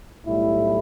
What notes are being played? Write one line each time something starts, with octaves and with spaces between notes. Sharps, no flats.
B1 A2 G3 E4